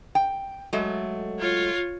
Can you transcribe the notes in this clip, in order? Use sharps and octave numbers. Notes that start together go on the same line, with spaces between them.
G5
F#3 G#3 A3
F4 C#5